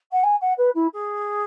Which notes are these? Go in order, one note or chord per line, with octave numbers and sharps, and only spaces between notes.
F#5
G#5
F#5
B4
E4
G#4